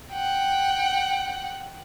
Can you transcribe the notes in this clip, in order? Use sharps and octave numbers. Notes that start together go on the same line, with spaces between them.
F#5 G5